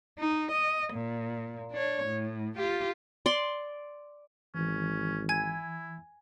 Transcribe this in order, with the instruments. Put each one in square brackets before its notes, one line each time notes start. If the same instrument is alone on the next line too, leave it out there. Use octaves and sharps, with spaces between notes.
[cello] D#4
D#5
A#2
D4 C#5
A2
F4 G4
[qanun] D5 C6
[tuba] G#1 [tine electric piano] E3 [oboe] C#4
[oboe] E4 [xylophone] G#5 G#6